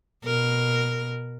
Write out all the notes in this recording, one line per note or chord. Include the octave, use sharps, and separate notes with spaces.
B2 A#4